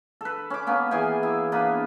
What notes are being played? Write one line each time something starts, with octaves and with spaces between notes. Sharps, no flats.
A4 B4
C#4 D6
A#3 B3 C#4
E3 G#4 G5 G#5
E4
A#3 B3 D4 B5